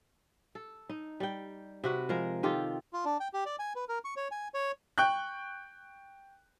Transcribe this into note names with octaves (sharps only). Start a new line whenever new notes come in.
A4
D#4
G3 G5
C3 F#4 B4
F3 G#3 A#4
D#3 F4 G4 A4
F4
D4
G5
G4
D5
G#5
B4
A#4
C#6
C#5
G#5
C#5
G5 C#6 F#6 G6